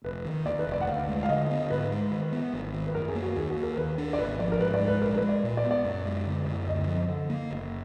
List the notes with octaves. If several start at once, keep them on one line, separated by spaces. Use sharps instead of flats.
F1 B4
D#3
D#2 D5
B4
F1
D5
F#5
D2 F5
G#3
F5
D3 D#5
B3
G#2 B4
G#3
D#3
B3
G#1
D#3
B4
F#2 A#4
G#4
A#3
F#4
D#2 G#4
F#4
A#3
A#4
A#4
D#3 B4
D4
D5
G#1 B4
F3 D5
A#4
G#2 B4
D5
G#3
B4
A#1 A#4
B4
G#3
D5
A#2
D5
B3
D5
F#2
G#3
D3
F#2
D2 D#5
F3
D3
A#3
F#1